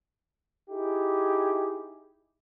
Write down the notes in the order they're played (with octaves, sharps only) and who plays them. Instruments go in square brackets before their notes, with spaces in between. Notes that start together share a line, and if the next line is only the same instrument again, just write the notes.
[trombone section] D#4 E4 G4 G#4